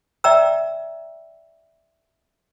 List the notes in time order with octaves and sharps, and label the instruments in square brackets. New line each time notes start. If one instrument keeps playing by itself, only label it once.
[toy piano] D5 E5 G5 A#5 E6